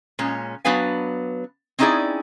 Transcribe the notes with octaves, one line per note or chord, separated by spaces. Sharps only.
A#2 G#3 C#4
F#3 B3 D4 B4 F5 G#5
C4 C#4 D#4 E4 G#4 D5